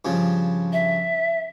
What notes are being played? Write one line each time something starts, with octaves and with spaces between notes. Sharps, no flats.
G2 C#3 F3
E5